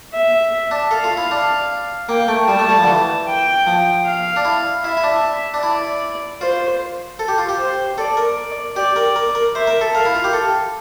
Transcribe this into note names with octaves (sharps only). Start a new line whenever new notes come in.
E5
D4
A4 F5
F4
E4
D4
A#3 G5
A3
G3 A5
A3
G3
F3
D3
E3
G5
F3
F5
D4
E4
E4 E5
E4
D4
D4
E4 D5
F4 C5
A4
G4
F4
G4
C5
A4 D5
A#4
G4 D5
A#4
A#4
A#4
C5 E5
A#4
A4
A#4 F5
E4
F4
G4
A4